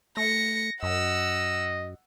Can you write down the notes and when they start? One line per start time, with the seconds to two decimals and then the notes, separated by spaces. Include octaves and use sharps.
0.17 A3 A#6 C#7
0.83 F#2 D#5 F#5 E6